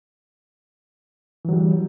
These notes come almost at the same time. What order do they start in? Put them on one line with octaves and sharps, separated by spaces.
E3 F#3 G3